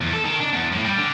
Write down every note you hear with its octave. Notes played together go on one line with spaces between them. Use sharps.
E2
A4
D#3
D4
E2
A2
G3
D3